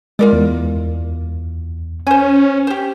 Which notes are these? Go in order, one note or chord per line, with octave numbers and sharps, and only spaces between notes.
G#3 F4 A#4 D5
E2
C#4 C5 G#5
G4 C5